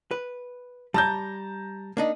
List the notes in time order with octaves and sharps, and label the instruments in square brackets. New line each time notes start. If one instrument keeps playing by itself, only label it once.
[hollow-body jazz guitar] B4
[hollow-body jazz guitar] G3 [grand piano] A5 A#5 G6
[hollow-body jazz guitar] A#3 D4 D#4